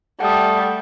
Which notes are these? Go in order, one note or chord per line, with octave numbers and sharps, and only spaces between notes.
G3 A3 F#5 D#6